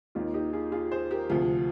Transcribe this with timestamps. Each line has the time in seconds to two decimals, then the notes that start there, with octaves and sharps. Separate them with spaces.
0.15 D#2 D#3 F4
0.34 D#4 G4
0.53 F4 G#4
0.72 F4 G#4
0.92 G#4 C5
1.11 G4 A#4
1.30 D2 C3 F3 F4 G#4